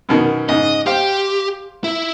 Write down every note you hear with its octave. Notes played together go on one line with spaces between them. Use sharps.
F#2 B2 D#3
G#2 C#3 D#5
G4 C5 F5
E4